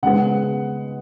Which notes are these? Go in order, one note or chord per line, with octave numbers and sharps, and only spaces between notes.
C#3 G#3 B3 F#5